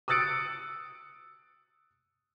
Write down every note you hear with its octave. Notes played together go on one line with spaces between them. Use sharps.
D#6 E6 F#6 A6 C#7 D7